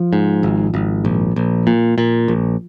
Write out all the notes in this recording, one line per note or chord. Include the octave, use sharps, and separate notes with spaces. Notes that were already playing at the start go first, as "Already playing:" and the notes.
Already playing: F3
G#2
G#1
G#1
A#1
A#1
A#2
A#2
A#1